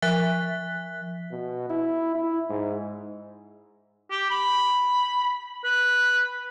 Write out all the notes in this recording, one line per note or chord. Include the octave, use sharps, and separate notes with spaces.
F3 E5 F#6 B6
B2
E4
E4
G#2
G4
B5
B4